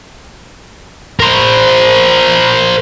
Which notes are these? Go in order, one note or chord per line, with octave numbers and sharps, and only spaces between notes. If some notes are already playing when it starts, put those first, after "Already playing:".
A#4 C5